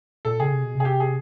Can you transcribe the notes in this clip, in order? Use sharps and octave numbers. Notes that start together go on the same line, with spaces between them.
A#2 A4
C#3 G#4
C3
B2
C3 G#4
G4
G#4